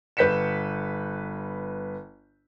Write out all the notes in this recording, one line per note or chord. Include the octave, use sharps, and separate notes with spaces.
G1 B4 G6 B6 C#7 E7